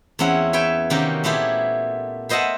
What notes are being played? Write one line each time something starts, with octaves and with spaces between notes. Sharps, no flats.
E2 C4 C#4 E4 F#5
B4 C#5 E5 G5
C3 D#3 A#3 C#4 F#4 G4
A#2 A3 B3 E4 G4 G#4
B4 C5 D#5 E5 F#5 A5